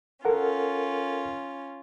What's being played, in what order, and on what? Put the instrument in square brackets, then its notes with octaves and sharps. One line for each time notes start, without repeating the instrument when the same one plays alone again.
[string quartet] C#4 F4 [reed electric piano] A4 A#4 F#5